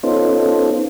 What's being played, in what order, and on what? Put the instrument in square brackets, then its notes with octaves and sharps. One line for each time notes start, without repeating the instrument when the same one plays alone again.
[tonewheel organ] B3 C#4 D#4 F4 A4 C5